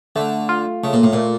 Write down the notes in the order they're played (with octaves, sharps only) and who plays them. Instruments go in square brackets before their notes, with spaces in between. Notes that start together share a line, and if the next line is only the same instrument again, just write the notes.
[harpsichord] D3 [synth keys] A3
[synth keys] F4
[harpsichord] C#3 [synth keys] A3
[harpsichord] A#2
A2
[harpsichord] A#2 [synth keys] A3